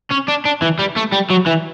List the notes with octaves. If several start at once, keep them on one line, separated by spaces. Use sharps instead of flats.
C#4
D4
D4
E3
G3
A3
G3
F#3
E3